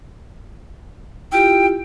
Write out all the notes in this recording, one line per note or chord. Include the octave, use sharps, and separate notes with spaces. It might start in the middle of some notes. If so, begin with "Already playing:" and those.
E4 F4 G4 G5